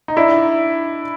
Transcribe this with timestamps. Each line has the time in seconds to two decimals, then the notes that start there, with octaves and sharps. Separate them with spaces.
0.08 D#4
0.16 D4 E4